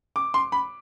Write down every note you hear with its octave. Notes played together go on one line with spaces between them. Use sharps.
D6
C6
B5